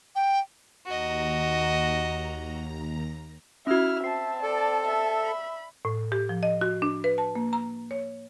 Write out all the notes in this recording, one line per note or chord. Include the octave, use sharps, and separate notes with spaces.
G5
D#2 F#4 D#5 A#5
C#4 E4 F#4 E5 F6
C4 A5 C7
A4 D5
E5
B5
A2
G4
F3
D#5
F#4
D4
B4
A5
A#3
A#5
C#5